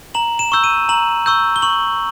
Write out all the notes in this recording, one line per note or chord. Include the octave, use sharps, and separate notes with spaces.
A#5 F#7
E7
C#6 E6 G6
D#7
A#5 F#7
C#6 E6 G6
G7
C#6 F#7